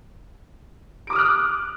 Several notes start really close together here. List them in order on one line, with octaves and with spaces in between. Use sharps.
D7 D6 D#6 F6 F#6